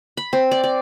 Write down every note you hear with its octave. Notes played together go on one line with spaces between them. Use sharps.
B5
C4
D5
D5